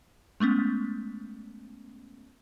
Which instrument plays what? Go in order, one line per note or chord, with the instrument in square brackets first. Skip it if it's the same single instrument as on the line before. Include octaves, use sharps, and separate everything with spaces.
[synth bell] G#3 A3 B3 C#4